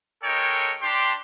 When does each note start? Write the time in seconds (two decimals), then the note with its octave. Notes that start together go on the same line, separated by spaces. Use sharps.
0.23 G#3 D#4 A4 A#4 C#5 G5
0.82 D4 G4 C6